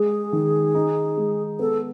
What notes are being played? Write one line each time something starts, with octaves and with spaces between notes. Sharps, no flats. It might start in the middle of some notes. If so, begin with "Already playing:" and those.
Already playing: G#3 G#4
D#3
D#4
G#3
B3 A4